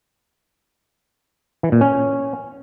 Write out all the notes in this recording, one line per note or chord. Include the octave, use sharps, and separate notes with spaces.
E3
A#2
C#4